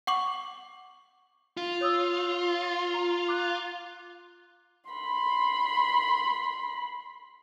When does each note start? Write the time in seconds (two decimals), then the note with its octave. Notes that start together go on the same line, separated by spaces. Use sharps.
0.07 F#5 C#6 D6 F#7
1.57 F4
1.81 C#5 D#6 E6
2.94 A#5
3.28 D6 F#6
4.91 B5 C6